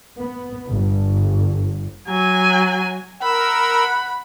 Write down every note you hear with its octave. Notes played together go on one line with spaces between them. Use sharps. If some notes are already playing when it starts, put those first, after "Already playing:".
B3
G1
F#3 G#5
A#4 F#5 B5 E6